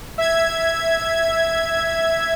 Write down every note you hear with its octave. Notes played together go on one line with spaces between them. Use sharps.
E5 G#6